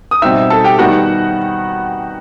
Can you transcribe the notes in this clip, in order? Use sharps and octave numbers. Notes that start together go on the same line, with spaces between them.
D#6
B2 G3 C4 D#4 E5 E6
A4 A5
G4 G5
D#3 G3 B3 D#4 F#4 F#5